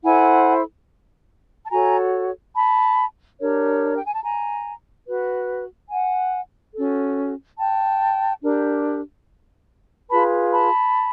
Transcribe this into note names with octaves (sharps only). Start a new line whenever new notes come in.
E4 A4 C5 F#5 G#5
A5
F#4 A4 C#5 G#5 A#5
A5 B5
D4 G4 A#4 C#5
G5
G#5
A5
G#5 A#5
F#4 B4
F#5 G#5
C#4 F#4 A4
G5 A5
D4 G4 A#4
F4 G#4 B4 A5 B5
A5 B5